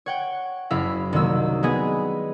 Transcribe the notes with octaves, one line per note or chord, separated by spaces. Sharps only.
C#5 F#5 G5
F#1 E4 E5 F5
C2 D#3 F#3 A#3 E6
G#3 B3 G#4